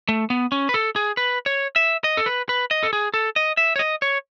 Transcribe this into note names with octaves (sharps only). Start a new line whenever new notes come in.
A3
B3
C#4
B4
A4
G#4
B4
C#5
E5
D#5
A4
B4
B4
D#5
A4
G#4
A4
D#5
E5
C#5
D#5
C#5